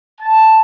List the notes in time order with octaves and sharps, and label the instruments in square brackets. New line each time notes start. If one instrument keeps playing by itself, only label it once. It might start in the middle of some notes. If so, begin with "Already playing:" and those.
[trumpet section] A5